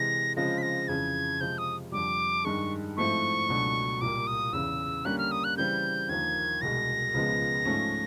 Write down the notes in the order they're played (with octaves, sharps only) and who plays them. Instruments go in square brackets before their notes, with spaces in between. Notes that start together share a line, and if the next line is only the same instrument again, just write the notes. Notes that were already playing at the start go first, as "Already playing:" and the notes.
Already playing: [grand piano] C3 E3 G#3 [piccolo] A#6
[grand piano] C#3 F3 G#3 C4 F4 [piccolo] A#6
[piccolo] B6
A#6
[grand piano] F2 C#3 E3 [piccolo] G#6
[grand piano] C3 F3 G#3 [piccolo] G6
[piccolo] D#6
[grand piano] F2 D3 G3 [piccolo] D6
[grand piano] G2 D#3 G#3 [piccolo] C#6
[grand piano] G#2 F3 A3 C4 E4 [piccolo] C#6
[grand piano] C#2 B2 F#3 A3 D4
[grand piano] C2 A#2 G3 A#3 [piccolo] D6
[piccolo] D#6
[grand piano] E2 C#3 E3 [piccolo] E6
[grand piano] D3 G3 A#3 C#4 [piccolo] F#6
[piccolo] F6
D#6
F#6
[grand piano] C#3 E3 G3 C4 [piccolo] G6
[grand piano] D#2 D3 F3 A#3 [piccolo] G#6
[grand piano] C2 B2 G#3 [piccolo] A#6
[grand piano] C#2 C#3 F3 G#3 B3
G#2 F3 A3 C#4